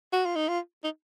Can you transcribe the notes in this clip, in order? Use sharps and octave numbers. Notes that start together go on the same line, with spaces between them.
F#4
F4
D#4
F4
D#4